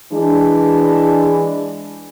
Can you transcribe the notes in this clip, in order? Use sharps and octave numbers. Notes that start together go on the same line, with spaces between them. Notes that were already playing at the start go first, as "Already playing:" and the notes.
E3 G#3 D4